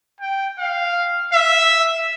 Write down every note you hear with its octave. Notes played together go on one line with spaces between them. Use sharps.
G5
F5
E5